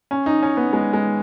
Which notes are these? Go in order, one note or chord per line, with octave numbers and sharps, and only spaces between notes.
C#4
D#4
C#4
B3
G#3
G#3